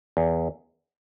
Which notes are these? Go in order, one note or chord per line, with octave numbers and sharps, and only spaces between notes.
E2